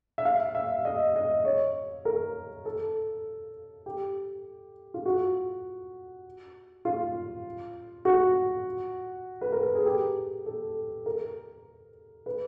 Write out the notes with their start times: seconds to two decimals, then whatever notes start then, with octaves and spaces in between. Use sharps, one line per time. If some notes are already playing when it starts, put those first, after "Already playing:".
0.18 E5
0.25 F5
0.55 E5
0.85 D#5
1.16 D#5
1.45 C#5
2.05 A#4
2.65 A4
3.86 G4
4.94 F4
5.06 F#4
6.85 F4
8.05 F#4
9.41 B4
9.52 A#4
9.64 A4
9.75 G#4
9.86 G4
10.46 A4
11.06 A#4
12.26 B4